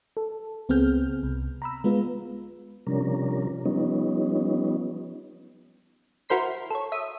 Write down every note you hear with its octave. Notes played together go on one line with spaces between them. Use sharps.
A4
C#2 B3 C4 G#4 F6 G6
C2
A#5 B5 E6
G#3 B3 F4 B4
C3 F3 G3 C#4 D4 A#4
F3 G3 B3 C#4 D#4
E4 F#4 A#4 C5 C6 B6
A4 C#5
E5 D#6